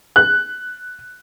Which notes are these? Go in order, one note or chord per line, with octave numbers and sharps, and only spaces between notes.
F#6